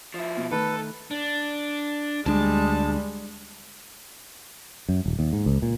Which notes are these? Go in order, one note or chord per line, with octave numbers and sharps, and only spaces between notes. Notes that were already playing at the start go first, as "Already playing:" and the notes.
F3 E4
B2
D#3 A3 A4 B4
D4
D2 G3 G#3 D4 A5
F#2
D#1
D#2
G#2
C#2
A#2